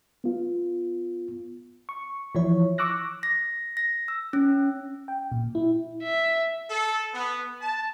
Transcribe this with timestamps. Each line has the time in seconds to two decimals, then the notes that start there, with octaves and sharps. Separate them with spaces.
0.24 B3 F4
1.89 C#6
2.35 E3 F3 E4 C#5
2.78 C#6 D6 E6 F#6 A#6
3.23 A#6
3.77 A#6
4.08 E6
4.33 C#4
5.08 G5
5.32 A#2
5.55 E4
6.03 E5
6.70 A4
7.14 B3
7.61 A5